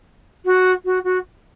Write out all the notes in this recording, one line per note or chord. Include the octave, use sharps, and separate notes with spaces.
F#4
F#4
F#4